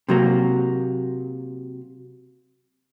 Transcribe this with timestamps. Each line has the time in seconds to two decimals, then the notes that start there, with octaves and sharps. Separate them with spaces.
0.09 C3 F#3 A#3